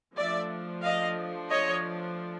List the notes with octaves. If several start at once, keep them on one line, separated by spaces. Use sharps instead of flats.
F3 A3 D4 D5 E5
D#5 F5
C#5 D#5